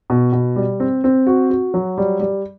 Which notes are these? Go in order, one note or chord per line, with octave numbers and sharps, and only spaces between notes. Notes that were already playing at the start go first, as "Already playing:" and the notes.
B2
B2
G3
C4
C4
F#4
F#4
F#3
G3
G3